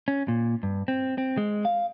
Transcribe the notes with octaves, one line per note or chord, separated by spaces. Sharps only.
C#4
A#2
G2
C4
C4
G#3
F5